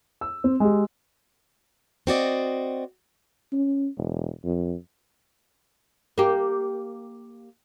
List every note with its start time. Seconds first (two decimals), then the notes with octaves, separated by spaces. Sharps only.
0.21 E6
0.44 C4
0.60 G#3 G4
2.07 C4 F#4 D5 D#5
3.52 C#4
3.97 E1
4.44 F2
6.18 A#3 G4